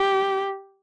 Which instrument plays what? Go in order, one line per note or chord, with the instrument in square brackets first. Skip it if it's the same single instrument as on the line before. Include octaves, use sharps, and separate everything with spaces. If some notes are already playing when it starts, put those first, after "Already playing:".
Already playing: [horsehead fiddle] G4